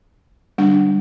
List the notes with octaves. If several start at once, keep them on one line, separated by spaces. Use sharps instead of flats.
D3 G3 D4